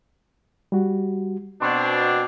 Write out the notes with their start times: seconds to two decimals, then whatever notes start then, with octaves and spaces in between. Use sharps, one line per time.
0.72 G3 F#4
1.62 B2 C4 D4 C6 C#6